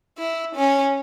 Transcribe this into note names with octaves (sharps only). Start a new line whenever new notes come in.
E4
C#4